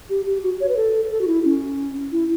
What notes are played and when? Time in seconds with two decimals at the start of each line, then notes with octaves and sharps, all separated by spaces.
0.10 G4
0.26 G4
0.43 F#4
0.61 C#5
0.69 B4
0.77 A4
1.11 A4
1.21 F#4
1.27 E4
1.45 C#4
2.12 E4